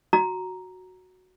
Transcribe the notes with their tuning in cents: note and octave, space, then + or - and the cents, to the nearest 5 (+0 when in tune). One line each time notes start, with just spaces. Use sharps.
F#4 +0 A#5 +0